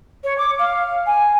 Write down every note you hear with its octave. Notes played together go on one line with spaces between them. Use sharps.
C#5
D6
F5
G#5